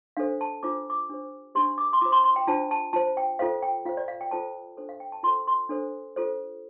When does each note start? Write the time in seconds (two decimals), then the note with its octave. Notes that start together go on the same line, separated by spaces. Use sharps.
0.17 D4 A4 C5 F5
0.41 A5
0.63 D4 F4 C5 D6
0.90 D6
1.09 D4 G4 C5
1.55 D4 G4 C5 C6
1.78 D6
1.93 C6
2.01 F4 C5 D6
2.12 C6
2.24 C6
2.36 G5
2.47 D4 F4 C5 A5
2.71 A5
2.93 F4 C5 A5
3.17 G5
3.39 F4 A4 C5 F5
3.62 G5
3.86 F4 C5 F5
3.97 D5
4.08 F5
4.21 G5
4.31 F4 A4 C5 A5
4.77 D4 A4 C5
4.89 F5
5.00 G5
5.12 A5
5.23 F4 A4 C5 C6
5.47 C6
5.69 D4 A4 C5
6.16 F4 A4 C5